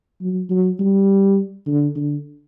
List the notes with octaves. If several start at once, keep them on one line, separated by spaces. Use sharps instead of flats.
F#3
F#3
G3
D3
D3